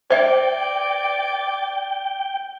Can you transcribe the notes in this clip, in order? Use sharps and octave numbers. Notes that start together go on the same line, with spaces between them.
C5 D5 E5 G5